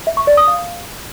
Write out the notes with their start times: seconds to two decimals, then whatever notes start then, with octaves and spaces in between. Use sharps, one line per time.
0.07 E5
0.17 C#6
0.27 D5
0.37 D#6
0.48 F5